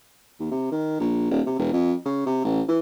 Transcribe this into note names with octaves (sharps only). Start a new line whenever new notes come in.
D#2
C3
D#3
A#1
D#1
C3
E1
F2
C#3
C3
A1
E3